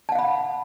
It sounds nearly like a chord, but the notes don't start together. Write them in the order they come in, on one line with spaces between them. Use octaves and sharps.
A5 F#5 F5 B5